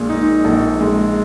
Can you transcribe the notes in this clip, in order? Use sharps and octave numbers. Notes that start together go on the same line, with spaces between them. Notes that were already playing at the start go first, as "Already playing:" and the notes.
Already playing: A#1 A#2 G#3
D#4
A#1
G#3